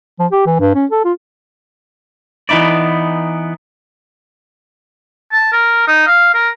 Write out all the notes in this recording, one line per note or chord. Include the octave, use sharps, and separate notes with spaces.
F3
G4
E3
G2
C#4
A4
F4
E3 B3 D#4 E4 D5
A5
A#4
D#4
F5
A#4